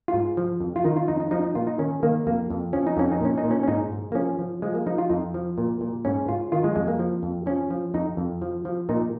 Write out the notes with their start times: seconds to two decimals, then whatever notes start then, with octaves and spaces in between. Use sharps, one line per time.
0.08 F4
0.13 G#2
0.37 F3
0.60 F2
0.76 F4
0.84 D#3 D#4
0.96 F4
1.08 F2 D#4
1.20 D#4
1.31 F3 D#4
1.43 D#4
1.55 A#2 F4
1.67 D#4
1.79 D#3 C#4
2.03 D#3 A#3
2.27 F2 A#3
2.50 F2
2.73 F3 C#4
2.87 D#4
2.97 F2 C#4
3.12 D#4
3.21 A#2 C#4
3.38 D#4
3.44 A#2
3.51 C#4
3.63 C#4
3.68 G#2 D#4
3.92 G#2
4.12 A#3
4.15 F3 C#4
4.39 F3
4.62 F3 G#3
4.75 A#3
4.86 F3 D#4
4.98 F4
5.10 F2 D#4
5.34 F3
5.58 A#2
5.81 A#2
6.05 G#2 C#4
6.29 G#2 F4
6.52 D#3 F4
6.64 G#3
6.76 F2 G#3
6.88 A#3
6.99 F3
7.23 F2
7.46 F3 C#4
7.71 F3
7.94 F2 D#4
8.17 F2
8.42 F3
8.65 F3
8.89 A#2 D#4